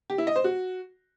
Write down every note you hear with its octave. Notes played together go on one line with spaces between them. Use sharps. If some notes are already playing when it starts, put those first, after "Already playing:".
G4
E4
D#5
C5
F#4